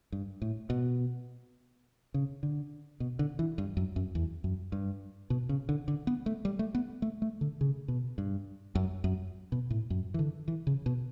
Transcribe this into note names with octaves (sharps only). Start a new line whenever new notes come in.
G2
A2
B2
C#3
D3
B2
D3
E3
G2
F#2
F#2
E2
F#2
G2
B2
C#3
D3
D3
B3
A3
G3
A3
B3
A3
A3
D3
C#3
B2
G2
F#2
F#2
B2
A2
F#2
E3
D3
E3
C#3
B2